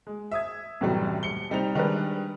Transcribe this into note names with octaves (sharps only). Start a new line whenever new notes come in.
G#3
E5 D#6 G#6
C2 F#2 A2 E3 F#3 G3
D#1 C#7 G7
C2 G3 C4 D#4 F7
D#3 G3 G#3 D4 A#4 B4